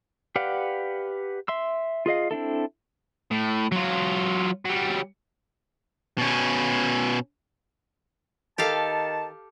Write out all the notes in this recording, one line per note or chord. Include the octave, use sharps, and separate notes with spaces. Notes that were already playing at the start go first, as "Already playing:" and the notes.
G4 B4 D5 F5 F#5
E5 C6 E6
F4 G#4 D#5 F5
C4 D4 E4 A4
A2
F#3 F4
F#3 G3
B2 C#4
D#3 G4 A4 F5 A5